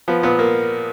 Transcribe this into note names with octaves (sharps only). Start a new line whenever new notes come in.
F3 B3
A#2 B3
A#3